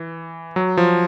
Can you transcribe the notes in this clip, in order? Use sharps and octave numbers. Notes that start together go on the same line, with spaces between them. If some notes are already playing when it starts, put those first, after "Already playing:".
Already playing: E3
F#3
F3